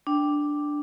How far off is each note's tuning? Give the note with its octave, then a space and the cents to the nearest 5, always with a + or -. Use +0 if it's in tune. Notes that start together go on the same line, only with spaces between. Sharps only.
D4 +0 G5 +0